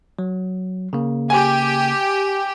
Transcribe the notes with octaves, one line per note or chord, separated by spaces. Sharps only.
F#3
C#3 A#3
G4 G#5